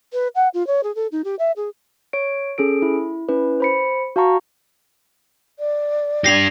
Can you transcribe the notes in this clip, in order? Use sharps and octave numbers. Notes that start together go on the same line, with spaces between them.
B4
F#5
F4
C#5
G#4
A4
D#4
G4
E5
G#4
C#5 D7
C#4 G#4 A4 D7
E4
C#4 E4 B4
C5 B5 C#7
F#4 F5 A5 A#5 C#6
D5
D4 G4 A#6 C7 F7